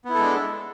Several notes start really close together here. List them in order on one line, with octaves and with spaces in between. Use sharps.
B3 E4 A4 G#3 D4